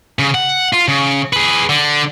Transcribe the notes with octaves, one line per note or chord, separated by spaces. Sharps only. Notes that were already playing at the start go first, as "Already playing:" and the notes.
C#3
F#5
F4
C#3
G#4 B4
D3